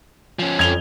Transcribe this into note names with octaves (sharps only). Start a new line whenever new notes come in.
F3 C#4
F2 G#6 F7 G7